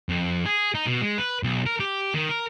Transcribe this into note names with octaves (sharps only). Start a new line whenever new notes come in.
F2
G#4
D#4
B2
G#3
B4
B1
A#4
G4
D#3
A#4